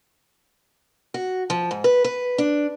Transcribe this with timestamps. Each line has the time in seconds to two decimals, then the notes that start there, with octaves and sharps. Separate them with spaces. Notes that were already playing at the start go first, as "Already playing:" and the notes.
1.14 F#4
1.50 F3
1.71 G#2
1.84 B4
2.04 B4
2.38 D4